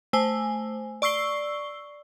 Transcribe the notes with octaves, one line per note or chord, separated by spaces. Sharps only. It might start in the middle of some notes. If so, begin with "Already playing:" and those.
A3 C5 G#5
D5 C#6 E6 C7 G7